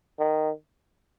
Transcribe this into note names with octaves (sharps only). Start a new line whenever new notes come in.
D#3